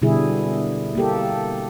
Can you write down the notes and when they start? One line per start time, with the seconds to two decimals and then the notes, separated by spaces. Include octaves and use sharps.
0.02 B2 D3 G3 E4 G#4
0.95 A#3 G4 A4